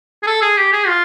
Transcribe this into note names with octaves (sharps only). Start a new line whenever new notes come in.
G#4
A4
G#4
G4
G#4
F4